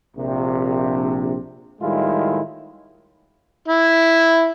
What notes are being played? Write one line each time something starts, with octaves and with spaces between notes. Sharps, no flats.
A#1 C3
A2 D#3 G3 G#3 E4 F4
E4